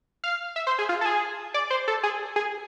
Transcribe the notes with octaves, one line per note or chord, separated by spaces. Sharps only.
F5
E5
C5
G#4
F4
A4
G#4
D5
C5
A4
G#4
G#4